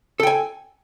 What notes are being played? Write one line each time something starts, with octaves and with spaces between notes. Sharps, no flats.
A4 G5 G#5